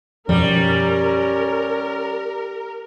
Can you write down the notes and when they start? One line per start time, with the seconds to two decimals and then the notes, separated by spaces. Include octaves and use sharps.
0.29 F#2 B2 F3 G3 C#4 A#4